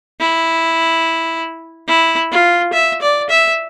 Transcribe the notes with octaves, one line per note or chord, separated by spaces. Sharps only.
E4
E4
F4
E5
D5
E5